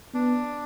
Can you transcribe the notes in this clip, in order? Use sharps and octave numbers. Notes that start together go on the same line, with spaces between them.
B3 D4